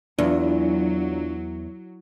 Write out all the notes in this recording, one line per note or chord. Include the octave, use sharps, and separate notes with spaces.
E2 F#3 D4 F4